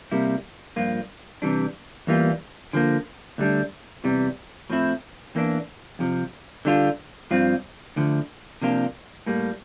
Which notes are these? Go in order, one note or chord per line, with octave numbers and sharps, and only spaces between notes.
C3 G3 A#3 E4
G2 F3 A#3 F4
C3 E3 G3 D4
E2 E3 G3 A#3 F4
D3 F3 A#3
D2 D3 G3 D4
E2 C3 E3 G3
A2 F3 C4 E4
E2 E3 A#3 D4
F2 C3 F3
D3 G3 D4 F4
G2 F3 C4 F4
D2 D3 F3
C3 F3 A#3 D4 F4
A2 G3 A#3